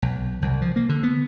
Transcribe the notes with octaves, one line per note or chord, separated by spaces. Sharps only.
B1
C2
F3
A#3
D3
B3